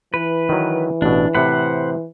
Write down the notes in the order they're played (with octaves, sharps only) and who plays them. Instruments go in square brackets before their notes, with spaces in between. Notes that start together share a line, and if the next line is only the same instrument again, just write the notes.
[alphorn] E3 [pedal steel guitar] B4
[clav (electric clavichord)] D#3 F#3
[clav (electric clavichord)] A1 B2 [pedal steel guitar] D4
[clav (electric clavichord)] A2 C3 [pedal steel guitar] C5 F#5 B5